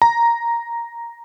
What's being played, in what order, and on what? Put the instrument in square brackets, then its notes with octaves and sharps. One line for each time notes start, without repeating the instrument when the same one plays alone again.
[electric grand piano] A#5